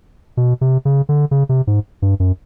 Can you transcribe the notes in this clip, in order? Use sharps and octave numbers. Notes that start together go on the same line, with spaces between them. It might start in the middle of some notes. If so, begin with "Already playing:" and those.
B2
C3
C#3
D3
C#3
C3
G#2
G2
F#2